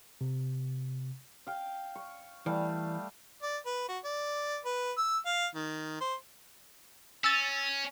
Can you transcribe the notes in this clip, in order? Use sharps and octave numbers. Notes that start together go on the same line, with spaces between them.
C3
F5 G5
C#6
E3 G3 A3 F5
D5
B4
F#4
D5
B4
E6
F5
D#3
C5
C#4 E6 A6